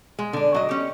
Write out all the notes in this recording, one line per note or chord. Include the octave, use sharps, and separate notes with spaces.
G#3
D3 D4
F#3 D#5
C#4 G4